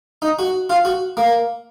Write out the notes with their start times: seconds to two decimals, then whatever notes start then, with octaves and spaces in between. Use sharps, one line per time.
0.22 D#4
0.39 F#4
0.70 F4
0.85 F#4
1.17 A#3